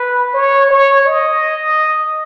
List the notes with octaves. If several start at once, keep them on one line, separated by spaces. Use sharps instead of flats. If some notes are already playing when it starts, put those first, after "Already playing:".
Already playing: B4
C#5
C#5
D#5